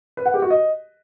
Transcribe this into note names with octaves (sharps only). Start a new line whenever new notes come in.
B4
F#5
G4
F#4
D#5